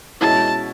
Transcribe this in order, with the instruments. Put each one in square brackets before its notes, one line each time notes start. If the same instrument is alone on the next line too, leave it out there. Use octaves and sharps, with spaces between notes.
[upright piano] B2 G#3 C#4 E4 [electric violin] A5